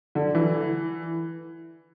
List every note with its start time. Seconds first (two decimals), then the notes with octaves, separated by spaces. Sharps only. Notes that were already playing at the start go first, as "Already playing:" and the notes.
0.15 D3
0.35 E3